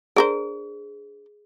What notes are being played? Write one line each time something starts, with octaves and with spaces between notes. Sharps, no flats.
D4 G#4 A#4 C5